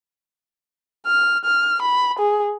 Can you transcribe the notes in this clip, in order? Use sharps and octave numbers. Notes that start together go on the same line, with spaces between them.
F6
F6
B5
G#4